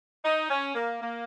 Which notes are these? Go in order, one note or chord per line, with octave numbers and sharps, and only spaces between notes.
D#4
C#4
A#3
A#3